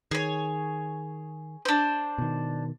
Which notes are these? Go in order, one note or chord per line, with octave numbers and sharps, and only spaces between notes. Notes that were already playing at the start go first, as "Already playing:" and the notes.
D#3 G#4 C#5
D4 C5
B2 D#3